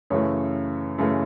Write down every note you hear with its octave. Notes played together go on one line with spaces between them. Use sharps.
F#2 C#3 E3 A3 C#5
F#2 C#3 E3 A3